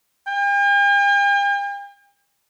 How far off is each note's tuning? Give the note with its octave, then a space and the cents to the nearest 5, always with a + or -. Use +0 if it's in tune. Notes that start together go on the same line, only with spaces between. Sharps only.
G5 +45